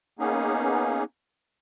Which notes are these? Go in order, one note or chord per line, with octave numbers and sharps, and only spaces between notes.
A#3 B3 C#4 D#4 G#4